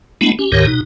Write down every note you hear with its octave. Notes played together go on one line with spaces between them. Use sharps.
G#3 A3 B3 D4 E4
C#4 G4
D2 G#2 D#3 G4 A#4 C#5
B2 D#4